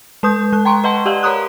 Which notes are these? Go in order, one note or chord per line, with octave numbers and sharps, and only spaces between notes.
G#3 B4 D#6 G6
G#3 F#6
G5 A#5 C6 C#6
B4 D#5 F#5 A5 C6
G4 D5 D#5 F5 F#5
A#4 C#5 A#5 C6 D#6 F#6